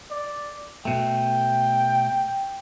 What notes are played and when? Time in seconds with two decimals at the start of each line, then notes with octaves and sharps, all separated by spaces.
0.11 D5
0.85 B2 A3 G5